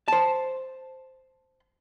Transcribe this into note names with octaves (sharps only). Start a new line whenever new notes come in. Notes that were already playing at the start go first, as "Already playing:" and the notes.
C5 A5